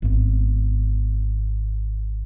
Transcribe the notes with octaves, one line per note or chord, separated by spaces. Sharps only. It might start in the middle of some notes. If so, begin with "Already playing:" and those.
G#1 B3